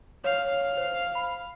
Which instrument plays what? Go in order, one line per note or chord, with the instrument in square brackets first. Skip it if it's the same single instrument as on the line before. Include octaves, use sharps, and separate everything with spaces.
[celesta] C#5 [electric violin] F5
[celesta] C5
B5